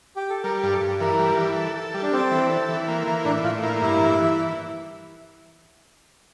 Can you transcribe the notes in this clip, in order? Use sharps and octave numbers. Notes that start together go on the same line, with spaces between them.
G4
A4
G3 A#4
G2
A4
G2
E3 A#4
G3
E3
A4
A4
G3
D4
C4 A4
E3
A4
E3
A#3
E3
A2 D4
A2 F4
A#3 E4
G2 E4
E3
E3